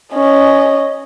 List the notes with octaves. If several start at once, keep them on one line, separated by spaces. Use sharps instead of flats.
C#4 D#5